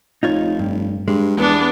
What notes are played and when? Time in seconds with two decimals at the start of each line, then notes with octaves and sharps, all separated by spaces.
0.23 F1 D#4 F4 C#5
0.59 G2
1.08 G2 G#3
1.37 E2 B3 D4